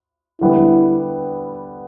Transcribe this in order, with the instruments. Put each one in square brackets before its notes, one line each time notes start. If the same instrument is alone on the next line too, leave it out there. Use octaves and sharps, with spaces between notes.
[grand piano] D3 G3 B3 [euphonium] E4